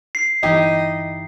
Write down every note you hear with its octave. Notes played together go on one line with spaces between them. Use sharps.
C7
G1 E3 D#4 E4 G4 D#5